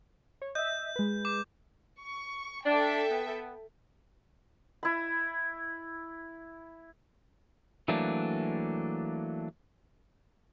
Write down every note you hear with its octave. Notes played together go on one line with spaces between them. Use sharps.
C#5
D#5 E5 G6
G#3 B4
D6
C#6
D4 A4 E5 G5
B3
E4 B5
E3 F#3 A3 A#3 D4